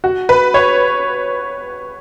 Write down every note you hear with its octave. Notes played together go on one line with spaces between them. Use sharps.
F#4
B4
C#5